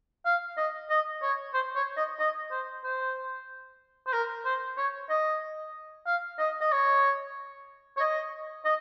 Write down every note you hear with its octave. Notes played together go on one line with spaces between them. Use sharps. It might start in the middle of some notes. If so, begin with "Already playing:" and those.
F5
D#5
D#5
C#5
C5
C#5
D#5
D#5
C5
C5
C5
A#4
C5
C#5
D#5
F5
D#5
D#5
C#5
C#5
D#5
D#5